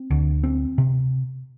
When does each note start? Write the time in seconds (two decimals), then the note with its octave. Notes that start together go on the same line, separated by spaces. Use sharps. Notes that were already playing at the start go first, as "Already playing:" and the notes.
Already playing: C4
0.10 D2
0.44 C4
0.78 C3